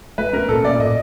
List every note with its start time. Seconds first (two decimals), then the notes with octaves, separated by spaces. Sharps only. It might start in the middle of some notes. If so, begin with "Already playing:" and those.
0.18 A3 B4
0.33 C#4 A#4
0.48 A#2 A4
0.64 A#2 D5
0.79 A2 D#5